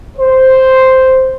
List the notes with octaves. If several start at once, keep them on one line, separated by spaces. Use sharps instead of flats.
C5